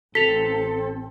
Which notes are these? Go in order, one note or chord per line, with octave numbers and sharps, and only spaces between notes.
A1 C4 A4 B6 F7